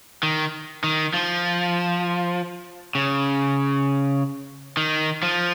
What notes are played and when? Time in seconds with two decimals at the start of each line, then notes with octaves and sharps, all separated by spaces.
0.23 D#3
0.84 D#3
1.14 F3
2.95 C#3
4.77 D#3
5.23 F3